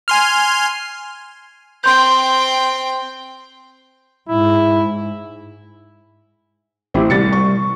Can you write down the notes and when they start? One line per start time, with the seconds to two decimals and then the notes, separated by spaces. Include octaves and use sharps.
0.08 G#5 C6 F6
1.84 C4 G5 C6 G6
4.29 G#2 E4
6.94 A1 C4 E4 G4
7.10 C2 C3 G3 A6 C#7
7.33 C#6